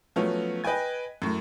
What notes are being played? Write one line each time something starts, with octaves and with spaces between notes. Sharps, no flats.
F3 F#3 A3 B3 C#4
B4 D#5 G5 G#5 G#6
F#2 A2